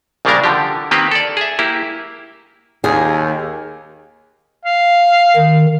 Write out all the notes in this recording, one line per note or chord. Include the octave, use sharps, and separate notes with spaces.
A#1 C#3 G3 A#3 D4 A#4
D3 F3 G4
D#3 A#3 C4 G4 B4
A4 D5
G#4 E5
A#3 E4 G4
D#2 G#4
F5
D#3